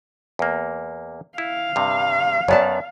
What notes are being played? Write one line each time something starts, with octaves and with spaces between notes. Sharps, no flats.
E2 A#3
E4 F5
G2 C3
F#2 B3 C#5 D5 A5